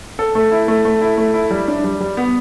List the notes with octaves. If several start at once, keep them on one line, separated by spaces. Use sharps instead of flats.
A4
A3
E4
A3
A3
E4
A3
E4
G3
D4
G3
G3
B3